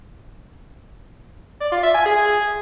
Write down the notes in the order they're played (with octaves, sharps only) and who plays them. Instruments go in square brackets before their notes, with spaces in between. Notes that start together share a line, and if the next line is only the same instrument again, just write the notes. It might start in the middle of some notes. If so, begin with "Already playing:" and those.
[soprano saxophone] D5
F4
E5
G#5
G#4